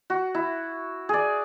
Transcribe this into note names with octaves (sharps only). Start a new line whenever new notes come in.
F#4
E4
G#4 D5